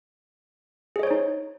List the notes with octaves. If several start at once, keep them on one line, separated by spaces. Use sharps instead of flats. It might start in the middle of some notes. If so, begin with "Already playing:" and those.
D#4 G#4 C5 C#5 D#5